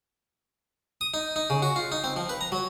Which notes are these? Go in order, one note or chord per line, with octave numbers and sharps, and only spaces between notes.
D#6
D#4
D#4
C#3
F#4
F4
D#4
C4
F3
B4
A#5
F#3